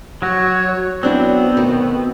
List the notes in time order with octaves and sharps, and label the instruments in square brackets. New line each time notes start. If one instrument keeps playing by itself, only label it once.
[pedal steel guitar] F#3 F#4 [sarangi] C#5
[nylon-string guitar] F#3 D4 E4 [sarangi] B3 [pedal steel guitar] C4
[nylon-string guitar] B2 D#3 A3